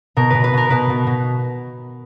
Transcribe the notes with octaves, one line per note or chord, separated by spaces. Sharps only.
B2 A#4
B2 B4
B4
B2 A#4
B2 B4
B2
B2